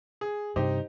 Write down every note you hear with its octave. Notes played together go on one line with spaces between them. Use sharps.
G#4
G2 C3 D#4 G4 C5